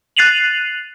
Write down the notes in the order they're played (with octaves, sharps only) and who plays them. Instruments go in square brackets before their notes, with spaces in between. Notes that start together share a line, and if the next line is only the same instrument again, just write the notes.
[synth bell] F#6 A6 C7 D#7 F7 F#7